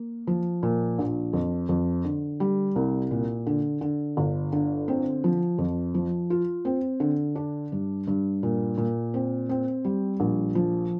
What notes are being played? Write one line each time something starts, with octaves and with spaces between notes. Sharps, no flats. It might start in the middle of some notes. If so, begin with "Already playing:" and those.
Already playing: A#3
F3
A#2
A#1
F2
F2
D3
G3
C2
A#2
D3
D3
G1
D3
C4
F3
F2
F3
F4
C4
D3
D4
G2
G2
A#2
A#2
C4
C4
G3
A#1
F3